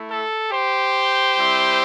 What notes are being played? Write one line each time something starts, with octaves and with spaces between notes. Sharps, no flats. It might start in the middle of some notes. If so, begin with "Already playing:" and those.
Already playing: A3 E4
A4
G4 C5
G3 C4 E4